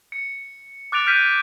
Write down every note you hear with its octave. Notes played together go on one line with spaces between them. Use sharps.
C#7
D6 F#6 A6 D7 F7
F6 G6 B6 D#7